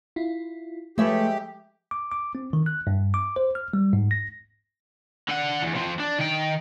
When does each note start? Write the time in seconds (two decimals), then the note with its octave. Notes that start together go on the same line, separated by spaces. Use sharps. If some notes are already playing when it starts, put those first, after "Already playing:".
0.16 E4 F4
0.98 F3 G#3 A3 G4 B4 E5
1.91 D6
2.12 D6
2.35 C4
2.53 D#3
2.66 F#6
2.87 G2
3.14 D6
3.36 C5
3.55 F6
3.73 G3
3.93 G#2
4.11 A#6
5.29 D3 F#5
5.62 E2
5.76 F3 C4
6.00 D4
6.19 D#3 G5